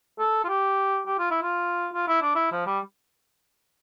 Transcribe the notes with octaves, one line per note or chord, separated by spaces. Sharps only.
A4
F4
G4
G4
F4
E4
F4
F4
E4
D4
E4
F3
G3